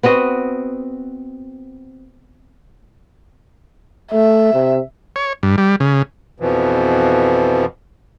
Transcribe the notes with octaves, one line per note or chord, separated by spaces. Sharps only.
B3 C4 F#4 D#5
A3 E5
C3
C#5
G2
G3
C#3
F2 B2 E3 F3